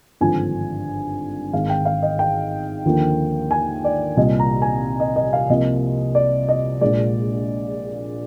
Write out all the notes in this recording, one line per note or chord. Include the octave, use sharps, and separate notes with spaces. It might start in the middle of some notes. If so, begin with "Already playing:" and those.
G#1 G2 D3 F3 G#5
G#1 G#2 D#3 F5
G5
F5
D#5
G5
D#2 D3 F3 A#3
G#5
D5
C2 A#2 G3 D#5
A#5
G#5
D#5
D#5
F5
C2 C3 F3 A#3 D#5
D5
D#5
A#1 A#2 G#3 D5